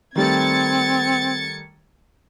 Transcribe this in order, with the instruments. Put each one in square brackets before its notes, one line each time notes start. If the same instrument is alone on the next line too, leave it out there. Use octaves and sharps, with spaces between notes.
[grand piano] D#3 G3 A3 [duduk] C4 [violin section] G#6 A6 C#7